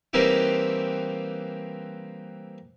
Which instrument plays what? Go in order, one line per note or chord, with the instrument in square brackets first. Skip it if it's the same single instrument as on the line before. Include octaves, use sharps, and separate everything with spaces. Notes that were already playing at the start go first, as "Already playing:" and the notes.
[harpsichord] E3 G3 A#3 C4 D#4 E4